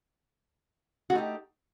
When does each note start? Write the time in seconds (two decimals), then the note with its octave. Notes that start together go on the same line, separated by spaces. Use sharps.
1.10 F#4
1.13 A3
1.15 D#4
1.18 G4